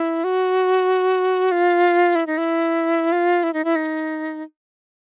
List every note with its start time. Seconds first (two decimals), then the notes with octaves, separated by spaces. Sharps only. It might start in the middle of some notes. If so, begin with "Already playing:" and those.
Already playing: E4
0.24 F#4
1.52 F4
2.15 E4
2.27 D#4
2.38 E4
3.12 F4
3.43 E4
3.54 D#4
3.65 E4
3.76 D#4